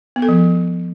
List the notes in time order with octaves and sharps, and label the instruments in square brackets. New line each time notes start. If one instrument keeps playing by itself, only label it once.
[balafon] B3
A4
F3